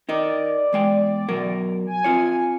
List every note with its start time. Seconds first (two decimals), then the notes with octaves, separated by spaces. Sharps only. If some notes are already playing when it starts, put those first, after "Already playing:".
0.09 D#4 A#4 D5 D#5
0.73 E2 G#3 G5
1.28 B2 F#3 A#4
1.87 G#5
2.04 C4 F4 C#5